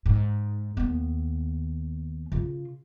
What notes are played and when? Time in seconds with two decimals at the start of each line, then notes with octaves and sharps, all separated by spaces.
0.06 G#2
0.77 D#2 B3
2.32 C#3 F4